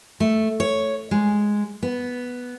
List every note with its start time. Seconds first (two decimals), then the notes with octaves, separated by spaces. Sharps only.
0.20 A3
0.60 C#5
1.11 G#3
1.83 B3